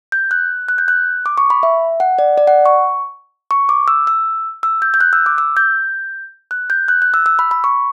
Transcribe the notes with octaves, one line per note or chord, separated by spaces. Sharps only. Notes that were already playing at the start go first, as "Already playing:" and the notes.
G6
F#6
F#6
G6
F#6
D6
C#6
B5
E5
F#5
D5
D5
F#5
C#6
C#6
D6
E6
E6
E6
G6
G6
F#6
E6
D6
E6
G6
F#6
G6
F#6
F#6
E6
E6
B5
B5
C#6